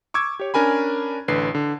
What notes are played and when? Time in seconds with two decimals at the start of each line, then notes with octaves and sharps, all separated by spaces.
0.14 C#6 D6 E6 G#6
0.40 G4 C#5
0.54 C#4 D4 A#4 G#5 B5
1.28 A1 D3 B4 C7
1.55 D3